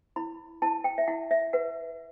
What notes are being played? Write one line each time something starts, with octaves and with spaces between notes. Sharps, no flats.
E4 B5
E4 A5
G5
E5
E4 F#5
E5
B4 F#5